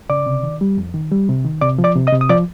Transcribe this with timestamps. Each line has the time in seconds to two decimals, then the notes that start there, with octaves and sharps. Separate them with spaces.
0.10 C#3 D5 D6
0.26 C3
0.43 D#3
0.61 G3
0.77 F2
0.94 D#3
1.11 G3
1.29 C3
1.45 D#3
1.61 C3 D5 D6
1.79 F3
1.84 D5 D6
1.95 C3
2.07 D#5 D#6
2.13 C3
2.21 D#6
2.29 F3 D5 D6